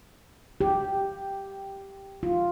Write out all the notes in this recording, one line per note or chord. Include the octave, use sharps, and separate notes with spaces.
G4
F4